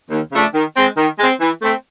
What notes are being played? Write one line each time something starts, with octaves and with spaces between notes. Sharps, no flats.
D#2
C#3 F3 A3 D4
D#3
G#3 C4
D#3
G#3 C4
E3
A3 C4